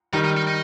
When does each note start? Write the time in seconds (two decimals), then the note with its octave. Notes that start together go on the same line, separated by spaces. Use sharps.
0.13 D#3 G3 D#4
0.24 D#4
0.37 D#4
0.47 D#4